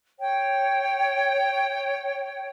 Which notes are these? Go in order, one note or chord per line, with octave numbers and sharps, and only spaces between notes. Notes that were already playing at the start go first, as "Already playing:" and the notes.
C#5 G5